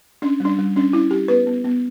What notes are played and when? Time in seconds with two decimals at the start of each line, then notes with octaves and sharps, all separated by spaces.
0.22 C#4 D4
0.40 G3 D4
0.59 G3
0.76 C#4 D4
0.93 C#4 E4
1.11 G3 G4
1.28 B3 B4
1.47 B3
1.64 B3